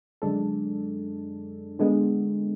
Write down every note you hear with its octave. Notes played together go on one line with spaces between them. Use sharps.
F#2 D3 G#3 D4 A4
D3 G#3 B3